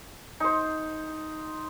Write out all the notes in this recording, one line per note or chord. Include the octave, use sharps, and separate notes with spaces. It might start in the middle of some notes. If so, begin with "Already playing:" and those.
D#4 C5